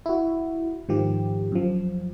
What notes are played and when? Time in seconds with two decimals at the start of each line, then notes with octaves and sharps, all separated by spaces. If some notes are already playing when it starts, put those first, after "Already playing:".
0.06 E4 F#4
0.89 G#2 D#3 F3 G4
1.52 F#2 F3